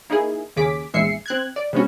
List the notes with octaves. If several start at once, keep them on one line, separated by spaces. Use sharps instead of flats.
A#3 D#4 E4 G#4
D#2 C#3 G#4 D6 B6
A#1 E2 G#3 E5 C7 C#7
C4 F#6 G#6
D5
C3 G#3 B3 C#4 F#4